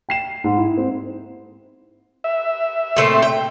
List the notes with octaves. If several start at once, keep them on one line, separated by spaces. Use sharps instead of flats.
G5 C7 E7
G#2
E4
C4
E5
A#2 A3 C4
G5